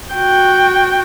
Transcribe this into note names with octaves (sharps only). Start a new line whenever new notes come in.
F#4 G5